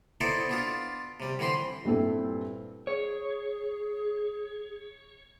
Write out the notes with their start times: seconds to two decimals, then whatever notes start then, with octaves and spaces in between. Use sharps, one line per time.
0.21 B3 D#4 E4 A4 C5 D5
0.49 B3 D4 F4
1.20 C3 G3
1.39 D3 E3 C4 B5 C6
1.85 G2 A#2 C4 E4 A4
2.87 G#4 C#5